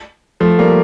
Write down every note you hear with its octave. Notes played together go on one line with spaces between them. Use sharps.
F3 A3
G3 A#3